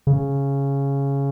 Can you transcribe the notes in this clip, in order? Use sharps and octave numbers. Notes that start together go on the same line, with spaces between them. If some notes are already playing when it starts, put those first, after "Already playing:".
C#3